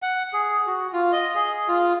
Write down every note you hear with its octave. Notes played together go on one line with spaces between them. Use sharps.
F#5
G#4
F#4
F4
D#5
G#4
F4